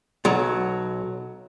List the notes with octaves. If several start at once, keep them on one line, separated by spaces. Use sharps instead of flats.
B1 F#3